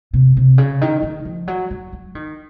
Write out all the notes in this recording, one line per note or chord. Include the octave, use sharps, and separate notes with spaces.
C3
C3
C#3
D#3
D#3
F3
F#3
F#3
F#3
D#3